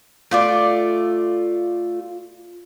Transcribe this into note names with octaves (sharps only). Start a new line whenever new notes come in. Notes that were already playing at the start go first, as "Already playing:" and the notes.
A3 F4 D5